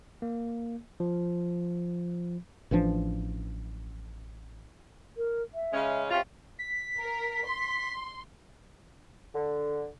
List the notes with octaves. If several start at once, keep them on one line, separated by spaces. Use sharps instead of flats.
A#3
F3
A1 E3 F3 D4
A#4
E5
C#3 G#3 C#4
C3 C#4 F4 F5
B6
A#4
C6
D3